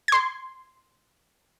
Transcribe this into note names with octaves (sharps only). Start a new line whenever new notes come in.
C6 G#6